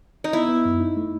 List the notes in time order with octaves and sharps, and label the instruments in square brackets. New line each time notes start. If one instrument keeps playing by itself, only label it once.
[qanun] D#4
[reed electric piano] B3 [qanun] E4
[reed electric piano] B3
F#2
D#4
A3